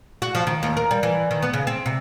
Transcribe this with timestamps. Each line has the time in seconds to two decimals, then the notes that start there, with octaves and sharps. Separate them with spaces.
0.22 F#4
0.35 F3
0.47 D#3
0.63 D#2
0.77 A#4
0.91 G3
1.03 E3
1.31 D#3
1.42 B3
1.54 C#3
1.67 C4
1.86 C3